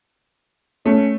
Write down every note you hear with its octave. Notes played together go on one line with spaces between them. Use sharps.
A3 C#4